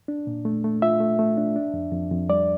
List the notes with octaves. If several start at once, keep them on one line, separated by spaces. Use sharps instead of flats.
D4
A#2
A3
A3
F4 E5
A3
A3
D4
D4
F2
F2
F2
G3 D5